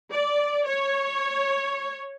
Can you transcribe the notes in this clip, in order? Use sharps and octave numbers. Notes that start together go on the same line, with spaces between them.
D5
C#5